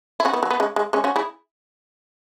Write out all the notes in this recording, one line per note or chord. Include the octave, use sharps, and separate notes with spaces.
E4
C#4 F#4
B3 E4
F#3
B3
G#3 C#4
G#3
G#3 C#4
C#4 F#4
E4 G#4